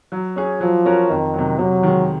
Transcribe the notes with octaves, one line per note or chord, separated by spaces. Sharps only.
F#3
C#4 G#4
F3 F#3
C#4 F#4 A#4
F2 D#3
C3 F#3
C3 F#3
D#3 G#3